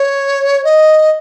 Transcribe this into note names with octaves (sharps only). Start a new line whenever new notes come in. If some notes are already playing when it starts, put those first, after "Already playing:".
Already playing: C#5
D#5